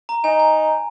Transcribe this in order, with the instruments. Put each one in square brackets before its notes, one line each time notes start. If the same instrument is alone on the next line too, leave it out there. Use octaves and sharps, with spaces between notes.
[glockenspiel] A#5
[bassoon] D#4 [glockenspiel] G#5
[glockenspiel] G#5